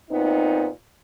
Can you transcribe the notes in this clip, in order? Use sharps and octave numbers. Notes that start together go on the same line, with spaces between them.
A#2 B3 C4 D#4